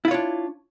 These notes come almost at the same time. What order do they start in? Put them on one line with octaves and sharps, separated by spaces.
E4 F4 C#5 D4